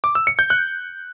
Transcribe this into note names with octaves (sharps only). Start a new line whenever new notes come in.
D6
E6
C#7
G6
F#6